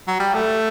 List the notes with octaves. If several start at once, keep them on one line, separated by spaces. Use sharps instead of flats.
F#3
G3
A3